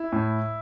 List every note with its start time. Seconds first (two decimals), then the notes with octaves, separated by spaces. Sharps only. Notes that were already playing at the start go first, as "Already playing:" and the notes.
Already playing: E4
0.12 A2